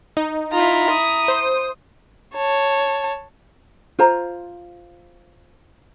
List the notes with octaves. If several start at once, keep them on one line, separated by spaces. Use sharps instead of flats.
D#4
E4 F4 A#5
D#6
C5
C#5 A5
F4 C5 A#5